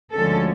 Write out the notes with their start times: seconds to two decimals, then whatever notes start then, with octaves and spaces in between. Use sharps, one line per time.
0.13 D2 D3 F3 G#3 C#4 A4